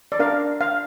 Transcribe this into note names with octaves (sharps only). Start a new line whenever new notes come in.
D5
D4 A#4 F5
F5